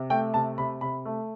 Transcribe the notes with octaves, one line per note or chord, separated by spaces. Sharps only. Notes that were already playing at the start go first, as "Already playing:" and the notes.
Already playing: C3
A3 G5
C3 A5
C3 B5
C3 B5
A3